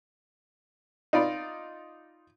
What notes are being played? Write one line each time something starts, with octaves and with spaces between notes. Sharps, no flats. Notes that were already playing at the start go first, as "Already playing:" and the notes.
D#4 F4 D5 B5